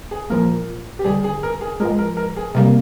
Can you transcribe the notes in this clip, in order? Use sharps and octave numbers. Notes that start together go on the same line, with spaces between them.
G#4
A#2 F3 A#3 A#4
G4
D#2 D3 G3 G#4
G#4
A#4
G#4
G#2 F3 G#3 A#4
A#4
A#4
G#4
C3 G3 A#3 A#4